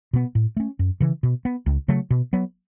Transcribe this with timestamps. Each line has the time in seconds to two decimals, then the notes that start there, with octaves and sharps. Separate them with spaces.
0.13 B2 B3
0.35 A2
0.57 A3 C#4
0.79 F#2
1.00 C#3 E3
1.23 B2
1.45 B3
1.66 C#2
1.88 C#3 F#3 A3
2.10 B2
2.33 F#3 B3